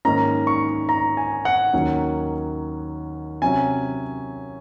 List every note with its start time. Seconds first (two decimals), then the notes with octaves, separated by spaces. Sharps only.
0.05 G#2 D#3 A#3 C#4 A#5
0.47 C#6
0.89 A#5
1.17 G#5
1.45 F#5
1.73 D#2 D#3 F#3 A#3 C#4
3.42 C3 F#3 C#4 G#5